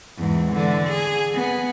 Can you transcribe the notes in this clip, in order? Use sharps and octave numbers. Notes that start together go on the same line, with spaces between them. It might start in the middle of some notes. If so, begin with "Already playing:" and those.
E2 G#2
D3 E3
G#4
B3